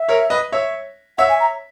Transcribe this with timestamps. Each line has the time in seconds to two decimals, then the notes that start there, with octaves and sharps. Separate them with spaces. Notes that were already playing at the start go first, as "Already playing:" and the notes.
Already playing: E5
0.09 A#4 C#5
0.30 B4 D#5
0.52 C#5 E5
1.18 C#5 E5 F#5
1.29 G#5
1.40 A#5